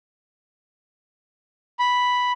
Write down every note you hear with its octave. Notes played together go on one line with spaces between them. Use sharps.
B5